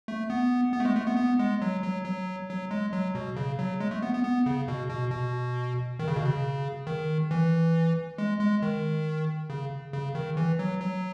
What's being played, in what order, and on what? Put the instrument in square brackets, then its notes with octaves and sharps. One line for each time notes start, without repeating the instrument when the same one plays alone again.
[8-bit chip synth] A3
B3
B3
A3
G#3
A3
B3
B3
G#3
F#3
F#3
F#3
F#3
G#3
F#3
B2
C#3
F#3
G#3
A3
B3
B3
B3
C#3
B2
B2
B2
D#3
C#3
B2
C#3
D#3
E3
G#3
G#3
D#3
C#3
C#3
D#3
E3
F#3
F#3